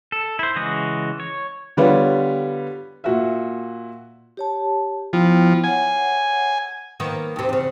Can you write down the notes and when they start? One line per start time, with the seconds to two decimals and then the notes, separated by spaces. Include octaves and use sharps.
0.12 A4
0.39 E4 C5
0.55 C#3 E3 G#3 F#4 D#6
1.20 C#5
1.77 D3 G3 B3 F4 G4 C#5
3.04 A#2 F#4 E5
4.37 G4 C#5 A5
5.13 F3 B3 E4 G5
5.64 C#5 F#5 G#5
7.00 D#3 A#3 B3
7.36 D#2 C3
7.49 E2 C#3